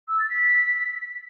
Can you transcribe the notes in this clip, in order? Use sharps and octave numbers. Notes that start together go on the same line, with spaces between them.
E6
A6
B6